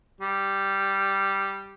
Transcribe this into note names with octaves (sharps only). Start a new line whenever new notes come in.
G3